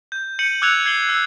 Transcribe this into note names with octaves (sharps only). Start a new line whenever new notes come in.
G6
G6 C#7 D#7 F#7
D6 E6 F#6 G#6 C#7 F7
G#6 C7 C#7 F#7 G7
E6